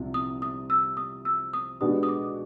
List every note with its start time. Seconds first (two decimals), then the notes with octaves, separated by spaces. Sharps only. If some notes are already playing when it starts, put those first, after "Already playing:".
Already playing: C2 C3 F3
0.14 D#6
0.42 D#6
0.70 E6
0.97 D#6
1.25 E6
1.53 D#6
1.80 B2 G#3 B3 D4 G4 D#6
2.03 D#6
2.09 D6